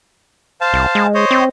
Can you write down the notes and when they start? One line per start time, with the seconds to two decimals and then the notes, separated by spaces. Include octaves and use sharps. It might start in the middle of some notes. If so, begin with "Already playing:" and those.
0.61 C5 F5 A5
0.73 C2
0.95 G#3
1.15 C5 C#5 D#5
1.31 C4